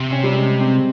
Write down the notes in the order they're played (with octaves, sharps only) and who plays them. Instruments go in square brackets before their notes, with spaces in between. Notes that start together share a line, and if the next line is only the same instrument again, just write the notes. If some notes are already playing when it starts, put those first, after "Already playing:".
Already playing: [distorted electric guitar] C3
[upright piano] C#4
G3
G#3
C4